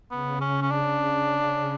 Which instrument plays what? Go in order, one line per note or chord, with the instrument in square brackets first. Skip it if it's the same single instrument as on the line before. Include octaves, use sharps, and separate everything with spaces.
[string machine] C#3 [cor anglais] B3
[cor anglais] C#4
C#4
D4
[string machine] C#3